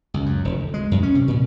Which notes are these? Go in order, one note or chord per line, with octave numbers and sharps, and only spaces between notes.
C#2
F#2
F1
D2
G#3
F#2
C#4
C3
A#2